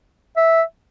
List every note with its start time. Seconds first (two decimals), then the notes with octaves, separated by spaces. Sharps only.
0.37 E5